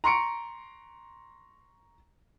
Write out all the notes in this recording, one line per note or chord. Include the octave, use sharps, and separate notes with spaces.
A#5 C6 C#6 C#7 D7